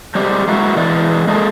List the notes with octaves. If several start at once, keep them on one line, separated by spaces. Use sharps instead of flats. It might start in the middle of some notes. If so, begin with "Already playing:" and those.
G3 G#3 C4 G4
G#3 A#3 E4 F#4
E3 G#3 D5
G#3 A#3 G#4 A4